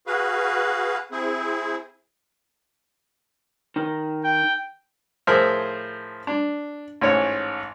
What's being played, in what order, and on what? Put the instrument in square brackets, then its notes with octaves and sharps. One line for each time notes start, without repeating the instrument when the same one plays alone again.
[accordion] F#4 G#4 B4 F5
C4 E4 G#4
[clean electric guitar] D#3
[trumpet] G5
[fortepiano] A2 F3 G#4 A#4 C5 E5
D4
A1 G#2 C#5